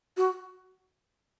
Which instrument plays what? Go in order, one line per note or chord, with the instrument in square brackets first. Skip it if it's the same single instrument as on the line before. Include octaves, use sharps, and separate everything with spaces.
[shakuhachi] F#4